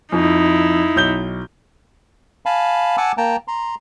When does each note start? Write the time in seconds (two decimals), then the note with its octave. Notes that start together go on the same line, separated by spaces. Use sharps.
0.12 F2 D#4 E4
0.96 B1 G6 G7
2.46 F5 G#5 A5 B5
2.98 F#5 G#5 A5 D6 E6
3.17 A#3 G5 A5 A#5
3.48 A#5 C6